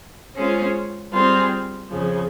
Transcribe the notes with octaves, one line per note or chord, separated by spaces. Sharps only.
G#3 C#4 F4 G#4 C5
G3 C4 F4 G#4
F2 C#3 F3